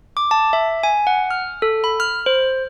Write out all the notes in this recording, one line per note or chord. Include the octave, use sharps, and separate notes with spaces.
D6
A5
E5
G#5
F#5
F6
A4
B5
F6
C5